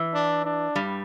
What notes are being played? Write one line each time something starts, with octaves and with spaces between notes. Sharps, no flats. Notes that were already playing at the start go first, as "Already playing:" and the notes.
Already playing: E3
D4
D4
G2 G3